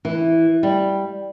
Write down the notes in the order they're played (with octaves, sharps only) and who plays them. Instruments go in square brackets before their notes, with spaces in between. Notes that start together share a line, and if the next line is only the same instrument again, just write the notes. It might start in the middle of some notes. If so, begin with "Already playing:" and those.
[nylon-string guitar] E3
G3